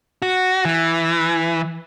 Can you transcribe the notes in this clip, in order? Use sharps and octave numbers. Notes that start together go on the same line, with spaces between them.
F#4
E3